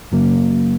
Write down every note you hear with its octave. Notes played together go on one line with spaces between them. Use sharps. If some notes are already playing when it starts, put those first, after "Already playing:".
F#2 C#3 F#3 A#3